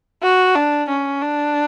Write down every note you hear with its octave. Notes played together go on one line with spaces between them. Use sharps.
F#4
D4
C#4
D4